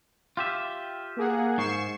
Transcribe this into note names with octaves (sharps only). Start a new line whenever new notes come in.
F4 G4 E5
A#3 G#4 F#5
G#2 C#6 C7 E7